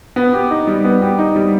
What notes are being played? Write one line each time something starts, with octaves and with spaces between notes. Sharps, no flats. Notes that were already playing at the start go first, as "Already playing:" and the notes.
B3
G4
D#4
G3
B3
G4
D#4
G3